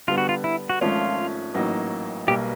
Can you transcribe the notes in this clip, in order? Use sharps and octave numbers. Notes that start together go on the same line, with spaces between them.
D3 G3 B3 F4
F#4
F4
E4
F#4
G#1 G#2 F3 A3 C#4 F4
A1 A2 F#3 A#3 D#4
B1 B2 G3 A#3 G4